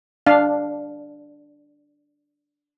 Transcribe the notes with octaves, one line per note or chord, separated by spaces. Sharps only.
D4 F5